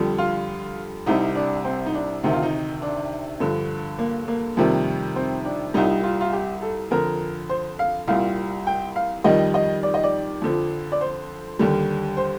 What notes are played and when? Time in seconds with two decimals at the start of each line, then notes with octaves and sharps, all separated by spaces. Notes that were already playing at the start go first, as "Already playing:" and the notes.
Already playing: F2 D3 G3
0.18 F4
1.06 C2 C3 G3 D#4
1.35 D4
1.65 C4
1.86 D#4
1.94 D4
2.23 D2 C3 D#3 D#4
2.33 F4
2.43 D#4
2.82 D4
3.40 G2 D3 F3
3.99 A#3
4.28 A#3
4.57 F2 C3 D#3 G3
5.16 C4
5.45 D4
5.74 C2 A#2 G3 D#4
6.03 F4
6.21 F4
6.33 G4
6.62 A4
6.91 F2 D3 F3 A#4
7.49 C5
7.79 F5
8.08 C2 A#2 G3 F5
8.67 G5
8.96 F5
9.24 F2 D#3 G3 D#5
9.54 D#5
9.83 D5
9.94 D#5
10.03 D5
10.42 F2 D3 F3
10.92 D5
11.01 C5
11.59 D#2 D3 G3
12.17 C5